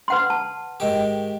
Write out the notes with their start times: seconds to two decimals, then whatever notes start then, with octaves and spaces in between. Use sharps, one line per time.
0.08 B4 F#5 C6
0.30 A5
0.80 G#2 D#3 G4